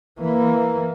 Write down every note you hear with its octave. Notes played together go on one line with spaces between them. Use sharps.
E3 A#3